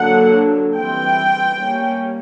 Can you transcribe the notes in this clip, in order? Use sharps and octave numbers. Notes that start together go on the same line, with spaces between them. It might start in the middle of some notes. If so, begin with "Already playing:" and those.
Already playing: D3 F#3 A#3 D4 F#5
E3 G3 C4 G5
G3 A#3 C#4